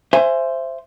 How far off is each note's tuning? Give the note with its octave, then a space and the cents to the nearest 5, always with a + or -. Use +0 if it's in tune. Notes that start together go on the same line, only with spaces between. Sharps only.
C5 +0 E5 +25 G#5 -5